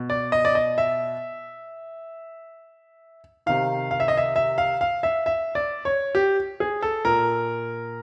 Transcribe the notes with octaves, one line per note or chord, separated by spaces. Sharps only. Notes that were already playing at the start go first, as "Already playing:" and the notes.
Already playing: B2
D5
D#5
D5
D#5
E5
C3 D#3 F5
F5
E5
D#5
E5
E5
F5
F5
E5
E5
D5
C#5
G4
G#4
A4
A#2 A#4